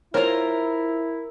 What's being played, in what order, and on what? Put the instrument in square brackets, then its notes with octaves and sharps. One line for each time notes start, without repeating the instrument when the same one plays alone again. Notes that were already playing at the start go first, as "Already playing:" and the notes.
[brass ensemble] E4 [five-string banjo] F4 C5 C#5 [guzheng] A#4 A#5